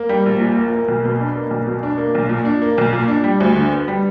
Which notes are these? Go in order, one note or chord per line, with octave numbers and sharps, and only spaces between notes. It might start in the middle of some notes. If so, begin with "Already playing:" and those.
Already playing: A#3
G3
A#1
A#2
A#3
A#3
B1
B2
D4
A#3
B1
B2
D4
A#3
B1
A#2
D4
A#3
B1
A#2
D4
G3
D2
D3
B3
G3